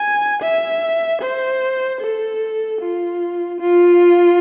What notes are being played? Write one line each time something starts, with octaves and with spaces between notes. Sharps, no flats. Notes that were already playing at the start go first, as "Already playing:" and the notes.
Already playing: G#5
E5
C5
A4
F4
F4